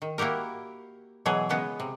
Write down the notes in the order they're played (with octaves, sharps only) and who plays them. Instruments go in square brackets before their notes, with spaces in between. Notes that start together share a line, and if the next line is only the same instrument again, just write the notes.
[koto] D#3
A#3 E4 F#4 G4 A#4
B2 E3 F#3 G#4
C#3 G#3 B3 D#4
C3